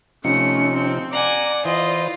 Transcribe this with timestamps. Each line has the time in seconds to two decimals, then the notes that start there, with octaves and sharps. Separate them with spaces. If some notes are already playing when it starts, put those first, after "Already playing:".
0.24 C3 F3 A3 C#4 D#4 C#7
0.74 C4
1.13 D5 F#5 G#5 A#5 D6
1.65 E3 F4 C5 D#5